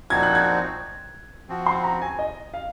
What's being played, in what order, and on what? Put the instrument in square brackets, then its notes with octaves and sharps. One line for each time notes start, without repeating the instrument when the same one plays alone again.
[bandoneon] A#2 F3 C4 D#4 F#4 [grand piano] G#6
[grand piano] F#6
G#6
[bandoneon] F3 C4 F#4
[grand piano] C6
A#5
G#5
D#5
F5